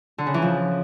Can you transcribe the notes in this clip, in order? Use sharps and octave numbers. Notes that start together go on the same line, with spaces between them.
D3
C#3
E3
F3